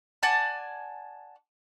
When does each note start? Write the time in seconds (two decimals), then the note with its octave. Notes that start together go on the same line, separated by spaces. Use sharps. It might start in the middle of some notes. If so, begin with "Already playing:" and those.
0.23 D5 F#5 G#5 A5